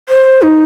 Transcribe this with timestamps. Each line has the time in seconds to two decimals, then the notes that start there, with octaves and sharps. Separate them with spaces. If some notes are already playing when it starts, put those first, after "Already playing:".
0.09 C5
0.42 D#4